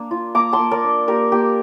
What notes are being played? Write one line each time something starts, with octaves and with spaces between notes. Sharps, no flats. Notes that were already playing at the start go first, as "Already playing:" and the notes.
Already playing: A#3 D4
F4
A#3 A#5 D6
A5 C6
A#3
A#4 D5
D4
A#3 G4 A#4
A#3 G4